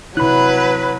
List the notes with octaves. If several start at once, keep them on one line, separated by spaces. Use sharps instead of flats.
C3 F#3 E4 B4 B5 F#6